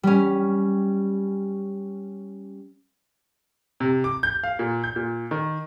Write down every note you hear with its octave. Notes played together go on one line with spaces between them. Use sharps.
G3 C#4
C3
D6
G6
F5
A#2
G6
A#2
D#3